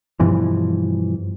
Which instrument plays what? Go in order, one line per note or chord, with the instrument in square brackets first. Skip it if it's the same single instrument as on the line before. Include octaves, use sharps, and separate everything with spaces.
[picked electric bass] G2 B2 E3 F3